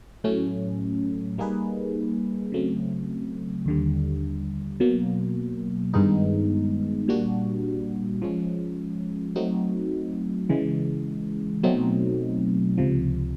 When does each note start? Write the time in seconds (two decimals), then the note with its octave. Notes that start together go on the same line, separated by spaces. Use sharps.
0.24 A2 F#3 A3 C#4
1.38 G3 A#3 D#4 G#4 B4
2.52 C#3 F#3 A3 C4
3.66 D#2 D3 G3
4.80 B2 F#3 A#3
5.94 G2 D#3 G#3 B3 D#4
7.08 A#2 G3 A#3 D4 F#4
8.22 F3 G#3 C#4
9.36 F#3 A3 C4 D#4 F#4
10.49 C#3 E3 G#3
11.63 B2 F#3 A3 C4 D#4
12.78 C#2 C3 F3